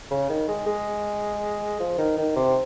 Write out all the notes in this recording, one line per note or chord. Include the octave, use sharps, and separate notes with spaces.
C#3
D#3
G#3
G#3
F3
D#3
D#3
C3